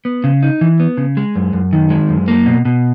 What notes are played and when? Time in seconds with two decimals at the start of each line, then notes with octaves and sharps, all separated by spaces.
0.05 B3
0.24 C#3
0.43 D#4
0.61 E3
0.80 B3
0.97 C#3
1.17 G#3
1.36 F#2
1.53 F#2
1.73 D#3
1.90 G#3
2.09 F#2
2.28 A#3
2.46 B2
2.65 B2